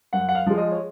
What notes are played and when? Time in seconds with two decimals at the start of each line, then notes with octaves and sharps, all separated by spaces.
0.13 F#2 F#5
0.29 F#5
0.35 F5
0.46 F3 G#3
0.58 D#5
0.71 C#5